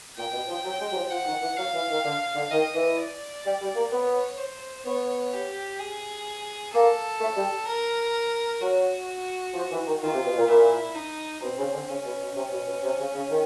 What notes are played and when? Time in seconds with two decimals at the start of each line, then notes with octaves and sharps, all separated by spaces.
0.16 A#2 G5
0.32 B2
0.48 F3
0.64 F#3
0.79 G#3
0.90 F#3
0.95 F3
1.10 F3 F#5
1.26 D#3
1.41 E3
1.57 F#3 F5
1.73 E3
1.89 D#3
2.04 D3
2.35 D3
2.51 D#3 D#5
2.75 E3
2.98 D5
3.45 G3
3.61 G3
3.75 A#3
3.91 B3 C#5
4.38 C5
4.85 B3 C#5
5.33 G4
5.79 G#4
6.73 A#3 A4
7.20 A3
7.36 G3
7.67 A#4
8.60 F#3 F#4
9.53 F3
9.70 E3
9.85 D#3
10.01 D#3 F4
10.13 C3
10.24 B2
10.36 A#2
10.48 A#2 E4
10.95 D#4
11.41 B2 C4
11.57 C#3
11.73 D3
11.88 C#3 C#4
12.04 B2
12.20 B2
12.35 C3 C#4
12.51 B2
12.67 B2
12.83 C3
12.98 C#3
13.14 C#3
13.29 D#3